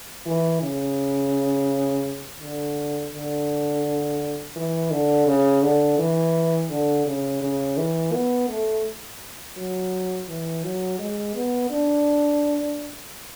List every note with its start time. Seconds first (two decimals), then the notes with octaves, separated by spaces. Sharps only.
0.26 E3
0.62 C#3
2.42 D3
3.13 D3
4.56 E3
4.91 D3
5.27 C#3
5.63 D3
5.99 E3
6.70 D3
7.06 C#3
7.42 C#3
7.77 E3
8.13 B3
8.49 A3
9.57 F#3
10.28 E3
10.64 F#3
10.99 G#3
11.35 B3
11.71 D4